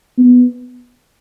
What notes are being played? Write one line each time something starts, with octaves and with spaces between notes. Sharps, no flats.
B3